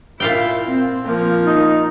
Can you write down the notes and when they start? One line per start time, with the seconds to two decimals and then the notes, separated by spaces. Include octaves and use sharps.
0.20 A#2 E4 F5 G5
0.67 C4
1.05 F3 A#3
1.45 D#4